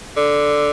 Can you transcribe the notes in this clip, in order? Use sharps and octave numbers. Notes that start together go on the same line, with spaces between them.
D3